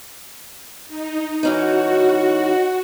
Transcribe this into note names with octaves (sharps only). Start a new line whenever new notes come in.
D#4
E3 C#4 D#4 F#4